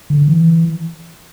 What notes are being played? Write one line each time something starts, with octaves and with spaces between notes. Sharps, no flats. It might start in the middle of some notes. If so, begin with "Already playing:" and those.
D3
E3